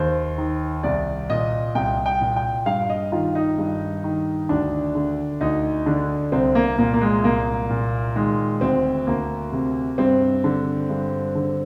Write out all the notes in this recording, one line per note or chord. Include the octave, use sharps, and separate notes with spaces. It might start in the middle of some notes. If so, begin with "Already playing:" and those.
Already playing: D#2 D#3 C5
D#3
C2 D5
A#2 D#5
C2 G5
G5
A#2
G5
G2 F5
D#5
D#3 F4
D#4
G2
D#3
D2 D4
D3
D2 D#4
D3 D4
C2 C4
A#3
A#2 A#3
A#3
G#3
C2 A#3
A#2
D#3 G#3
D2 C4
D2 A#3
C3
G2 C4
D3
G2
D3